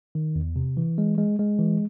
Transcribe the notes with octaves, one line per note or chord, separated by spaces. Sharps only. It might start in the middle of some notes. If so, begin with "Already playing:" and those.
D#3
E2
C3
E3
G#3
G#3
G#3
E3